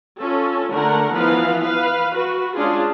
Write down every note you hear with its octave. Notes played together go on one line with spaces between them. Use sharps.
C#4 F4 A4
D3 A3 A#4 F#5
E3 F3 B3 B4 F5
B4 F5
F#4 B4
G#3 C#4 D4 F4 G#4